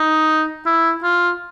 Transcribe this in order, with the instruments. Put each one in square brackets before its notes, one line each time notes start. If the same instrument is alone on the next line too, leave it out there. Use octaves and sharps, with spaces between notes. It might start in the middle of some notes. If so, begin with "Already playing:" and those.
Already playing: [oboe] D#4
E4
F4